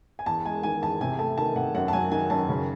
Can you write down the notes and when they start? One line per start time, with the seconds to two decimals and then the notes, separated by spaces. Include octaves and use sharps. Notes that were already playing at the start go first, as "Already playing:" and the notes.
0.19 G#5
0.26 E2 A5
0.45 G#3 G#5
0.63 D#3 G#5
0.82 E2 A5
1.01 C3 G#5
1.19 A3 A5
1.38 D#3 A5
1.56 C3 F#5
1.74 F#2 F#5
1.88 A5
1.93 F#3 G#5
2.12 D#3 G#5
2.30 F#2 A5
2.49 C#3